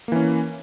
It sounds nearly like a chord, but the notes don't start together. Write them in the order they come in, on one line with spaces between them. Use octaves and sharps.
A#3 E3 C#4